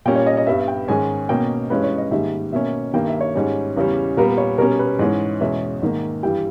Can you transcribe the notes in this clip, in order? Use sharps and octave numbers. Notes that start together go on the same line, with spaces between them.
A#2 G3 A#3 C#4 G5
C#5
D#5
D#5
G2 G3 B3 E5
G5
G#2 D#3 G#3 C#4 G#5
B2 A#3 C#4 G5
G2 E3 G#3 C#4 B4
C#5
D#5
G#2 D#3 G3 A#3 E5
B2 A#3 C#4 E5
G2 D#3 A#3 G5
E5
C#5
G#2 G3 C#4
E2 C#3 E3 G3 C#4
A#2 G3 B3 A#4
C#5
B2 G3 C#4 A#4
B4
G#2 E3 G#3 C#4
E2 B2 G#3 C#4 E5
G#2 D#3 A#3
G2 E3 G3 G5